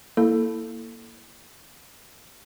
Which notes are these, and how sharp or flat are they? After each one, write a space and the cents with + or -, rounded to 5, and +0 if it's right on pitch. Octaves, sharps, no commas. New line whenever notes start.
A#3 +0 E4 +0 A4 +0